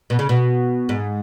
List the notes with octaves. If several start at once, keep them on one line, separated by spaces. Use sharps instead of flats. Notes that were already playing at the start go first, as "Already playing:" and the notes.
B2
C#3
B2
G#2